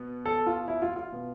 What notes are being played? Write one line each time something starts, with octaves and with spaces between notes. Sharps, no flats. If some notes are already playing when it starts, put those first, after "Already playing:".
Already playing: B2 B3
A4
F4
E4
F4
F4
B2 B3